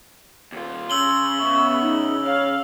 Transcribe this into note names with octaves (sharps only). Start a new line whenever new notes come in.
D#2 F4
C#3 C6 E6 F#7 G7
B3 E5 C#6
D#4
C#5 F5